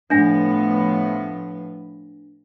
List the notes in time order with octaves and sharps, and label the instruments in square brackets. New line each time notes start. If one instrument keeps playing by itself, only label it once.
[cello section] A2 F3 B3 [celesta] D4 G#5 A#6